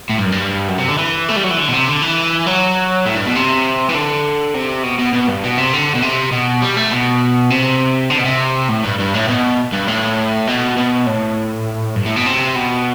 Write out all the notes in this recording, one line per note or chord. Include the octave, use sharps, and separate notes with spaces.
A2
G2
F#2
G2
F#2
C3
D3
E3
A3
G3
F#3
E3
D3
B2
C3
D3
E3
F#3
A2
G2
B2
C3
E3
D3
C3
B2
B2
B2
G2
B2
C3
D3
B2
C3
B2
G3
A3
B2
C3
D3
B2
C3
A2
G2
G2
A2
B2
G2
A2
B2
B2
A2
G2
A2
B2
C3
B2